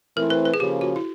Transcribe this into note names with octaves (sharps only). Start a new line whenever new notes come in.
E3 A3 C4 E4 A#4
B4
B4
G#4
C#3 F3 A#3 C#4 G4
F#4
E4